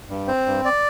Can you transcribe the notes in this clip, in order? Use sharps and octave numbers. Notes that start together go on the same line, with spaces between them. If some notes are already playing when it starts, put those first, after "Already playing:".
G2
C4 C5
G2
D5